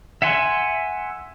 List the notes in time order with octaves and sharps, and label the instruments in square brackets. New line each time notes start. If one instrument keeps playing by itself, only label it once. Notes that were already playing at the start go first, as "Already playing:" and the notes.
[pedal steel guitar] E5 F#5 G#5 C6